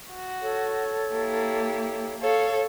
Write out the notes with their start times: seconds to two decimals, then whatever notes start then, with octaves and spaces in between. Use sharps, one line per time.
0.13 F#4
0.42 A4 C#5
1.12 A#3 E4 G4
2.20 A4 C#5 F5